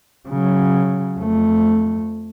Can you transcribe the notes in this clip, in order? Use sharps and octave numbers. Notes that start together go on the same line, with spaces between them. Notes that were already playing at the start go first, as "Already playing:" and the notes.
C#3 F#3
F2 A3